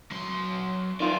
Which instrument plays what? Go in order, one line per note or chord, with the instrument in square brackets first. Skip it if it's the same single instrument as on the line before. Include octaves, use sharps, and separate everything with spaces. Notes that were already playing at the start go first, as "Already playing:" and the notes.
[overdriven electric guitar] F#3 C6
[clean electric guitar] D#3 F4 [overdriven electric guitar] D5